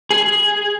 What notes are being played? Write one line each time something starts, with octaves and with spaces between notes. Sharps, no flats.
G#4